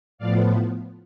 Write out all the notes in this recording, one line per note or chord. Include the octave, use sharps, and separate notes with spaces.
A2 F3 B3 D5 F5